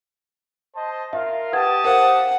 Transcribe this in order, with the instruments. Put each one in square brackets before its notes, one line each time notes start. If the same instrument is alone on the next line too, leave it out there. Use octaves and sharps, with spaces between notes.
[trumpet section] C5 D#5 A5
[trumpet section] F4 A#4 F5 [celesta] E5
[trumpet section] G4 A5 D#6 [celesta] B4 F#5 G#6
[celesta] A#4 C5 F5 [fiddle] F#5